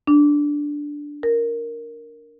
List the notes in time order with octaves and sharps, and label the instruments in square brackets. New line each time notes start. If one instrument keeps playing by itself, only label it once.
[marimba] D4
A#4